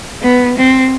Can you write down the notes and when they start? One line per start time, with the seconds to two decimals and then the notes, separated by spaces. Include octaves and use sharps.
0.23 B3
0.58 C4